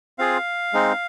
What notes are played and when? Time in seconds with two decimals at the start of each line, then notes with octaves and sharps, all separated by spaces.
0.18 C4 F4 G#4 F5
0.73 G#3 C4 D#4